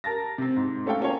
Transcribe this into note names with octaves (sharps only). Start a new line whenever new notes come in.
A#4 A5 A6 A#6
C3 C4
G#2
A3 C#4 A4 F5 G5
A#3 C#4 F4 C#5